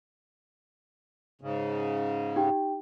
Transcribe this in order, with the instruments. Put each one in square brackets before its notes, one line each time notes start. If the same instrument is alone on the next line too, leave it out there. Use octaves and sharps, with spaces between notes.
[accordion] G#2 C#3
[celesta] D#4 G4 G5